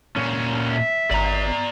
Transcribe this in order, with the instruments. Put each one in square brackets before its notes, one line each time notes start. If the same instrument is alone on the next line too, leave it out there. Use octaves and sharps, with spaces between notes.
[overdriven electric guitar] A#2 C#4
[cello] E5
[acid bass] G#1 [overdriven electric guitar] D5 A#5